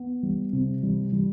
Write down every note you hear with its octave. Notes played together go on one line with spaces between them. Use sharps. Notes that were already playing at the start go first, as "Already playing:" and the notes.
Already playing: B3
G3
C3
G3
G3